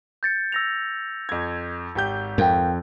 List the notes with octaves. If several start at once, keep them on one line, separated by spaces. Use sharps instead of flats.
G6 A6 C#7
E6 A#6 F7
F2 G#6
G#1 G4 G6
F2 A#4 F5 G5